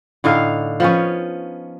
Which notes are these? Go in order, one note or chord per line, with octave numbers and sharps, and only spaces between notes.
A2 D3 D#4 F5
F3 B3 C#4